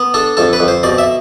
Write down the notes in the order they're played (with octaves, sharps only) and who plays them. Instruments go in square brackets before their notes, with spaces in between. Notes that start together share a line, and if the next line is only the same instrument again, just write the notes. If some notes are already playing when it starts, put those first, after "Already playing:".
Already playing: [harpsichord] B3
D4 A4
F2 A4
B4
F2
C5
B2 D5
E5